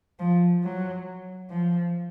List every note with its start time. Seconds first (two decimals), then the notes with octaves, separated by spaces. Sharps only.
0.19 F3
0.63 F#3
1.49 F3